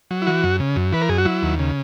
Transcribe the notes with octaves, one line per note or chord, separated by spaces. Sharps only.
F#3
E4
E3 F#4
F#2
C#3
F#2
E3 B4
A#4
F#2 G#4
F#4
F#3 E4
D#2
C#3